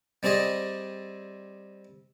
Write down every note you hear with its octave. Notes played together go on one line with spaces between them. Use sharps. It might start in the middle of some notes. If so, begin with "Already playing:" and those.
G3 C4 G#4 D5 D#5